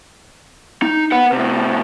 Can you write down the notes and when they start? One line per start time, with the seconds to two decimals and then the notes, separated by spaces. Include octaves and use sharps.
0.82 D#4
1.12 B4 F#5
1.32 A2 C3